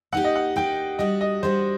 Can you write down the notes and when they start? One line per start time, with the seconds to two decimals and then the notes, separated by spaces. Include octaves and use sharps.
0.12 A#3 D#4 G4 F#5
0.24 D#5
0.35 F#5
0.56 A#3 D#4 G4 G5
0.99 G3 D4 F#4 D#5
1.21 D#5
1.43 G3 D4 F#4 C5